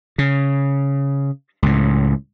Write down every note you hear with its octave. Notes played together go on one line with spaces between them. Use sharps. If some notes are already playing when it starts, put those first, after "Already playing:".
C#3
C#2 A2